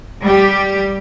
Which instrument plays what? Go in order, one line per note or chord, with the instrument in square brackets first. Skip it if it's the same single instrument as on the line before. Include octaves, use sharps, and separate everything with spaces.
[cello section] G3 G4